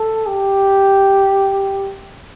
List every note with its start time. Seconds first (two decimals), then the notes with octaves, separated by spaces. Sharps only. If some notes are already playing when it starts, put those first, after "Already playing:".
Already playing: A4
0.27 G4